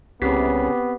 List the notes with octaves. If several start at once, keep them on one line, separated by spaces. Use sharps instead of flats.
C2 C#3 B3 C4 G4 B6